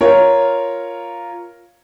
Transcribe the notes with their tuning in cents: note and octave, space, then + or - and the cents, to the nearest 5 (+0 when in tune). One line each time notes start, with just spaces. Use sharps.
F4 +0 A#4 +0 C#5 +0